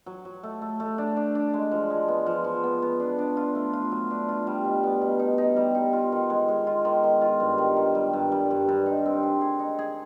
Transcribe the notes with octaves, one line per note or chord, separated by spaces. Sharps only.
F#3
F#3
A3
A3
A3
D4
D4
D4
G#3
F3
G#3
B3
F3
F3
B3
B3
D4
D4
F4
A3
F4
F#3
D4
F4
G3
B2
B3
B2
D#4
D#4
G3
D#4
F4
D#3
G#3
G#3
F4
D#3
D#3
F4
G2
D#3
D#3
G3
G2
G3
G2
G2
D#4
C4
G#4
G#4
D#4
G#4